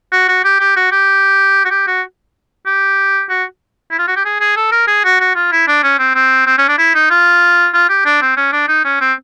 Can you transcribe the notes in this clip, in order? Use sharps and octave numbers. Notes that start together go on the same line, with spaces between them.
F#4
F#4
G4
G4
F#4
G4
F#4
G4
F#4
G4
F#4
E4
F4
F#4
G4
G#4
G#4
A4
A#4
G#4
F#4
F#4
F4
E4
D4
C#4
C4
C4
C4
C#4
D4
E4
D#4
F4
F4
G4
D4
C4
C#4
D4
D#4
C#4
C4